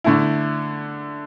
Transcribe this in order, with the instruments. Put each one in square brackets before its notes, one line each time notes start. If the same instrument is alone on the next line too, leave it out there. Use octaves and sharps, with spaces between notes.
[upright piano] D3 A3 E4